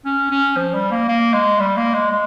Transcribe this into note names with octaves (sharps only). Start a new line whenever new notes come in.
C#4
C#4
F3
G3
A#3
A#3
G#3
G3
A#3
G#3
G#3